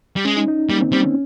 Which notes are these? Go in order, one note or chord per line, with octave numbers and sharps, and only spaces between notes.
G3
G#3 C#4
D#4
D#4
G3 A#3
C4
G3 C4
C#4